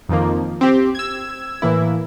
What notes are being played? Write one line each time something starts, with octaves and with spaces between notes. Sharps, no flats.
F2 D#3 F3 A#3
C4 G4
E6 G#6
A2 E3 A#3 E4